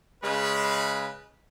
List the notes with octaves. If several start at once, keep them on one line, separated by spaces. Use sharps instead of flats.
C#3 G#3 B4